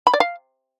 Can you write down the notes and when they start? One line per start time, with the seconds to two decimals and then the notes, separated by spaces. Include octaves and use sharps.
0.07 B5
0.14 D5
0.20 F5